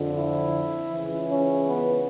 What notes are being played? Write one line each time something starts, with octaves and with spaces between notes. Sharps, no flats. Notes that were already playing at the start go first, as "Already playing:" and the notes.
Already playing: F2 D3 F3
E4
C#2 C#3 E3
C#4
B3